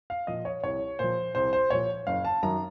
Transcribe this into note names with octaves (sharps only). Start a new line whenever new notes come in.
F5
A#2 F3 D#5
C#5
C2 C#5
A#2 F3 C5
C2 C5
C5
A#2 F3 C#5
F#1 F5
A5
F#2 D#3 F#3 A#5